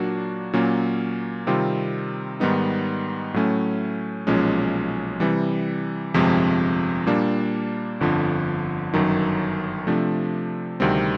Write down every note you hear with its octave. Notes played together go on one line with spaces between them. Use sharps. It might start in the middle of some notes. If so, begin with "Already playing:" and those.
Already playing: A#2 F#3 A#3 D4 F#4
A#2 F#3 A#3 C#4
C3 D#3 G3 C4 F4
G#2 D#3 G3 B3 D#4
A2 F#3 A3 C#4
B1 A#2 F3 G#3 C#4
C3 E3 G3
G1 F2 C3 F3 G#3
A#2 G3 A#3 D4
G1 F2 D3 F3
G1 F#2 D#3 F#3
C3 F3 A3 D4
D2 C3 D#3 G3 C4